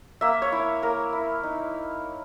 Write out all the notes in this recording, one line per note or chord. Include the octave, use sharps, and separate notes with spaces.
A#3 E5
C#5
E4
A#3 A#4
E4
D#4